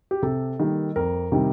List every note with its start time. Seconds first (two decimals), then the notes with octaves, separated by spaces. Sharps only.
0.11 G4
0.22 C3 A4
0.60 D#3 G3 A#3
0.96 F2 A#4
1.32 C3 D#3 G3